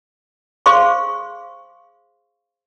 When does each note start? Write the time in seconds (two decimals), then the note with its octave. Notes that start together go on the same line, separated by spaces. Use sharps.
0.66 G#4 C5 F5 C6 C#6